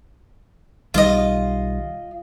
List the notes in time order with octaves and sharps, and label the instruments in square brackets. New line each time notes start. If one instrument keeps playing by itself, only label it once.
[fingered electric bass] B1 D#3 G3 [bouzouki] F4 D#5